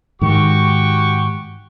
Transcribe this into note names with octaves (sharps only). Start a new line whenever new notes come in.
G#2 D#3 F#4 G4 C#6